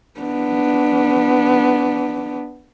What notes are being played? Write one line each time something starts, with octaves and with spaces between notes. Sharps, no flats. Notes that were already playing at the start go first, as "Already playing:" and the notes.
B3 D4